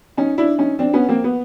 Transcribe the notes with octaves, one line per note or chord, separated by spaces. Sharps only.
C#4 D#4
D4 E4
C#4 D#4
C4 D4
B3 C#4
A#3 C4
B3